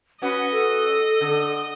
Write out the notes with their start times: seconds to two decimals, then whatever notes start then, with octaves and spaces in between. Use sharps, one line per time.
0.22 C#4 F#4 B4 D#5 F#5
0.52 A4
1.21 D3